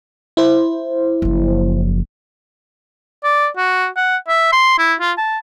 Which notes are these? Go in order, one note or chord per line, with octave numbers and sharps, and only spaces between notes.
E4 C5
F#1 F3
D5
F#4
F#5
E5
C6
E4
F4
A5